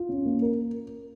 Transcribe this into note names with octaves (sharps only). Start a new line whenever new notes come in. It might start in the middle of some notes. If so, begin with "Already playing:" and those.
Already playing: F4
C#4
A#3
A#4